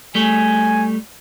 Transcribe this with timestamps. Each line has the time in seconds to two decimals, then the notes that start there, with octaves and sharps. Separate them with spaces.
0.15 G3 A3 G#5